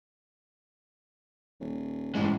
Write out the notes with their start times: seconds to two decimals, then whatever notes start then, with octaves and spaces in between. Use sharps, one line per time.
1.60 D#1
2.15 A1 A2 G#3